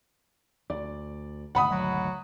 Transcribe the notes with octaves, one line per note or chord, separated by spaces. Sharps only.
D2 D5
G#1 D2 B2 F#5 B5 D#6
F#3